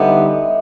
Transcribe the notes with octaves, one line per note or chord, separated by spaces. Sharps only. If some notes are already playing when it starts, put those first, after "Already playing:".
Already playing: D3 G3 B3 D#4 G4 D#5 E5